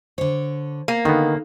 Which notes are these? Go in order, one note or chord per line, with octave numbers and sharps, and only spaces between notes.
D3 C5 C#5
A#3
D3 D#3 B3 D#4 A4 F5